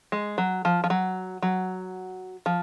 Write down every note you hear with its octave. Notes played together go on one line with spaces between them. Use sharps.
G#3
F#3
F3
F3
F#3
F#3
F3